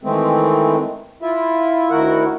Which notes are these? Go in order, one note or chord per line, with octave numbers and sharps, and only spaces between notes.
D#3 E3 G#3 A3 C4
E4 F4 E5
D2 D#3 E4 F#4 A#4 F#5